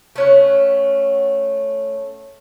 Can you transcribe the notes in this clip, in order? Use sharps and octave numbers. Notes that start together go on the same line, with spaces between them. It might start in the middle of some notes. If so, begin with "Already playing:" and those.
A3 C#4 F#5